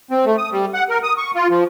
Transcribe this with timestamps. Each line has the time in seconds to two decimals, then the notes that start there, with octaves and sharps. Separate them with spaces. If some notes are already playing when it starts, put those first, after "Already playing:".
0.11 C4
0.26 A3
0.38 D#6
0.52 G3
0.74 F#5
0.90 A#4
1.03 D#6
1.18 C#6
1.35 F4
1.50 F3